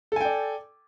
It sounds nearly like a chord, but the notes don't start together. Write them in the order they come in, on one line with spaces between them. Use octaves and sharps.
A4 G#5 G5 D5